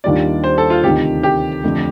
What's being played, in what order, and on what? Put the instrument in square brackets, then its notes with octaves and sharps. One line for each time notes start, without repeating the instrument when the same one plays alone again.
[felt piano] D#2 D#3 G3 D4 F4 [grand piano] D5
[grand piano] C5
A4
F4
[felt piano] D2 C3 D#3 [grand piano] G4
[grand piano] G4
[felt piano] F2 D3 A3